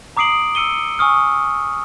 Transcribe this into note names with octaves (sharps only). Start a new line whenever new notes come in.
A#5 D6 D#6 C7 D7 F#7
E6 C#7 D#7 G7
G#5 C#6 D#6 F6